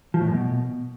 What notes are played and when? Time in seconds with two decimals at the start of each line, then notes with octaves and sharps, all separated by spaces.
0.14 F3
0.21 A2
0.28 F#2
0.34 B2